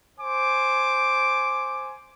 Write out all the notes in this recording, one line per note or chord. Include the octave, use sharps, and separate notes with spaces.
C5 G#5 D6